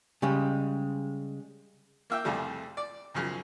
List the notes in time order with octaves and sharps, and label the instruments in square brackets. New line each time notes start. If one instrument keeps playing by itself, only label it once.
[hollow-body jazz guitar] C#3 G3 G#3
[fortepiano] A#3 E5 G5
C2 F2 C#3 G3 A3
D5
B1 F#2 C#3 F3